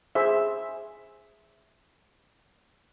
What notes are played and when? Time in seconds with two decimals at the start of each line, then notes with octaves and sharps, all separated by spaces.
0.15 G#4 C5 E5